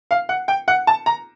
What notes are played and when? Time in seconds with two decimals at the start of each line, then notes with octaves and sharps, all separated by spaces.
0.11 F5
0.29 F#5
0.48 G5
0.68 F#5
0.87 A5
1.06 A#5